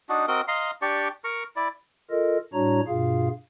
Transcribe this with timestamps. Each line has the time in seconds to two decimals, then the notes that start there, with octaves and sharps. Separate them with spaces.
0.09 D4 D#4 F#4
0.28 C4 F#4 A#4 D#5
0.48 D#5 F5 A#5 C6
0.82 D4 G4 D5 C#6
1.24 A#4 A#5 C#6
1.56 E4 D5
2.10 F4 A4 A#4 D#5
2.53 A2 G3 D4 F#4 C#5 A#5
2.87 G2 B2 F4 G#4 F5